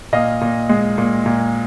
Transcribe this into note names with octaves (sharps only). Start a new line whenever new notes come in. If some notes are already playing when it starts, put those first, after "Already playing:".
A#2 D#5 F5
A#2
G#3
A#2
A#2